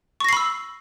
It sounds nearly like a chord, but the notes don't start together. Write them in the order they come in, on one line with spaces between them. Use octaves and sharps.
C#6 A#6 C7 B5 E6